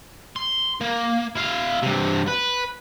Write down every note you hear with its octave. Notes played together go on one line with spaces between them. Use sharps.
C6
A#3
E4 F5
G2 C3
B4